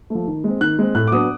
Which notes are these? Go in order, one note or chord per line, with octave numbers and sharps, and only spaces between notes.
F3 A3
D#3
G#3 C4
D#3 F#6
G#3 C4
A2 F#6
D6
F#3 B3 D4 D#6